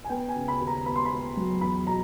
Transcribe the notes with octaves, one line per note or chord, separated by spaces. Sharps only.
G#5
B3 G5
G#5
C#3
B5
D#2
A#5
B3 B5
C6
B5
B3
F#3
E2 B5
B2 A#5